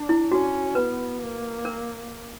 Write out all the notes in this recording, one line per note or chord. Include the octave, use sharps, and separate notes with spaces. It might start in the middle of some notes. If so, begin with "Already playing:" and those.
Already playing: D4
E4
C#4 F#4
B3 B4
A#3
A#4